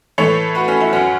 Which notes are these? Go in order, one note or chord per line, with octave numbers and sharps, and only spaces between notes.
A2 E3 A4 C#5
F#4 B4
C#4 F#4
E4
F#2 F#3 C#4 F#4